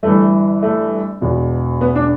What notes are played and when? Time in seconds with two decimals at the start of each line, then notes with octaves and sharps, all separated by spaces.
0.03 G1 G2 E3 A3
0.63 A3
1.21 E1 E2 B2
1.81 B3
1.96 D4